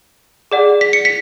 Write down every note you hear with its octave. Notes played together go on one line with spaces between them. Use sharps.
G#4 D5 F#5
B6
C#7
B6